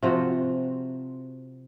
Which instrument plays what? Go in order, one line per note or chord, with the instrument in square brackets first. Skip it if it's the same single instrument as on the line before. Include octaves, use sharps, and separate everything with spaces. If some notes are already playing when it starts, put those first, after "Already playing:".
[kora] C3 F3 C4 F#4